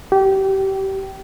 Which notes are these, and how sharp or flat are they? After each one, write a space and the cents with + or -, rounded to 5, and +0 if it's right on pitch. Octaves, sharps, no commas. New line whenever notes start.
G4 -25